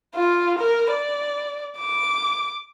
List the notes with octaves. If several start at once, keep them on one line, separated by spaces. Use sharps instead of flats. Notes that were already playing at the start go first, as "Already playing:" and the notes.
F4
A#4
D5
D6